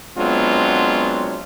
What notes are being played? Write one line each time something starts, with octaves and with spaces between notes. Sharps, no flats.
F#3 G#3 B3 C4 D4 F4